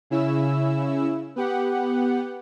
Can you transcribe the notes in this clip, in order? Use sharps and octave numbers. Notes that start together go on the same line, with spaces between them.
C#3 C#4 E4 E6
B3 G4 F#5